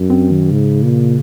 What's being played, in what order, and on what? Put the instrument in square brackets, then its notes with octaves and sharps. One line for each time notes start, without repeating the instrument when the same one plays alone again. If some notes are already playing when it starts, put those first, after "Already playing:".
Already playing: [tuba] F#2
[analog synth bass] C4
D#3
[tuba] G#2 [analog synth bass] C#3
[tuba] A#2